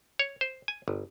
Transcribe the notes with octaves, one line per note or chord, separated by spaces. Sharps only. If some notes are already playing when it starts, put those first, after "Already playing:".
C#5
C5
G#5
G1